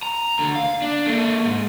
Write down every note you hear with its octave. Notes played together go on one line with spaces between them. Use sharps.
A#5
D2 D3
F5
D4
A#3 A4
G#2